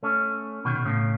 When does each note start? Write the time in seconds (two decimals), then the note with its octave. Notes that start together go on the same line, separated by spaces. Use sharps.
0.03 A3 C#4
0.65 B2 D#3
0.75 B2
0.85 A2 C#3